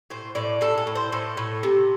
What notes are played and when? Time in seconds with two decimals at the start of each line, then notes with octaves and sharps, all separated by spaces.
0.10 A2 C5
0.35 A2 D5
0.61 A2 A4
0.78 A4
0.87 A2
0.95 C5
1.12 A2 A4
1.37 A2
1.63 C3